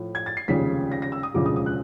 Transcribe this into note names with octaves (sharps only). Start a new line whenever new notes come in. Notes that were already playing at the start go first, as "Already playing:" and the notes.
Already playing: A2 F3
G#6
A6
C7
F1 D#2 C#3 F3 G#3 B6
A#6
A#6
E6
D#6
E1 D2 C#3 F3 G#3 D6
D#6
D#6
F#6